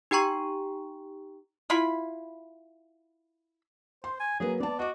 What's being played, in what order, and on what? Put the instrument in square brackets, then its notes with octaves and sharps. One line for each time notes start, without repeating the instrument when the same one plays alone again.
[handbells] D#4 G4 G5 A#5 C#6
[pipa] E4 F4 B5
[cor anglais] C5 [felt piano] C6
[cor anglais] G#5
[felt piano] F#3 A#3 B4 [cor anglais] G#4
[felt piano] B3 A5 [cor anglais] D5
[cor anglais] F#4 [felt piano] D#5 D6